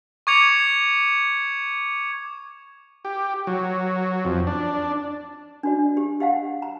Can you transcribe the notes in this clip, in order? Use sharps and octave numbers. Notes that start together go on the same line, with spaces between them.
C#6 D6 G#6 C#7 F7
G4
F#3
F2
D4
D4 F#4 D5
G4
G4 F5 F#5
A#5